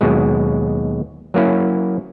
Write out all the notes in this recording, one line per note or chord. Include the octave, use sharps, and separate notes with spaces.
D#2 B2 F#3 G#3
F#3 A#3 C#4 E4